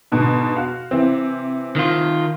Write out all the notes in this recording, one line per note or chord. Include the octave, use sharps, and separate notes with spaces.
G#2 B2 D3
F#4 F5
C3 E3 C4
D#3 F4